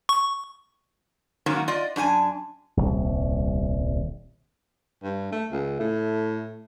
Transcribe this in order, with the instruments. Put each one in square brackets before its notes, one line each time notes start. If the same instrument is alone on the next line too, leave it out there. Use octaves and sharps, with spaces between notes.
[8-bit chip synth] C#6
[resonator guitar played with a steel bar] G#2 D#3 F#3 A#3 C#4
F4 D5 D#5
F#2 D4 G4 G#5 A5
[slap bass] D#1 C2
[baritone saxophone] G2
A3
C#2
[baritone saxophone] A2 [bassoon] A3